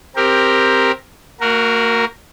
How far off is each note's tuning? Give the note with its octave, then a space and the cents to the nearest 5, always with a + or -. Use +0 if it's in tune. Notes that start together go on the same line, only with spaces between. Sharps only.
C4 +10 G4 +10 A#4 +0
A#3 -40 F#4 +0 A#4 +0